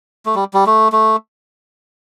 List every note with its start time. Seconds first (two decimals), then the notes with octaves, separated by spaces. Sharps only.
0.26 A3
0.35 G3
0.54 G3
0.67 A3
0.92 A3